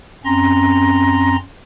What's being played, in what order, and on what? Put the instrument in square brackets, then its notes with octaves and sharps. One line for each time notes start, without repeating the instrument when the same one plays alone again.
[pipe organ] F#2 C4 C#4 A#5 C6 A#6